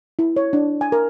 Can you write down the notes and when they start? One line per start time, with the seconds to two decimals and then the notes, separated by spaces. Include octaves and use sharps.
0.19 E4
0.36 C#5
0.53 D4
0.81 G#5
0.92 A#4